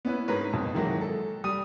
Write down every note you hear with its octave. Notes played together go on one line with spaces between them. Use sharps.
B3 C#4 E4 B4
G#2 A#4 B4 C#5
B1 F2 B2
D#3 E3 F#3 G#3 A#3 F#4
A4
G3 D#6 D#7